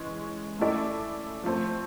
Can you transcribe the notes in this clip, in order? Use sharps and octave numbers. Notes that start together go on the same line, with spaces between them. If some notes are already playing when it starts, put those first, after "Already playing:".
Already playing: E3 G#3 C#4
A3 C#4 E4 A4 D5
F3 A3 C4